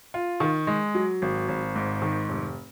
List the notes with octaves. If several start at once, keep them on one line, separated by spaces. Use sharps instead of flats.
F4
D#3
G#3
F#3
G#1
G#1
G#2
D#3
F1